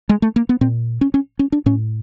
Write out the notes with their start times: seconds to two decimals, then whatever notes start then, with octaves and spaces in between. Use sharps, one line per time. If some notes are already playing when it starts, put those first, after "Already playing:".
0.09 G#3
0.22 A3
0.36 A#3
0.49 B3
0.61 A#2 C4
1.01 C#4
1.14 C#4
1.39 C#4
1.52 D4
1.66 A2 C#4